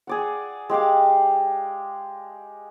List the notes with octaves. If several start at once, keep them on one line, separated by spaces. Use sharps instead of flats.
G#4 D5 F#5
G#3 G4 F5 D6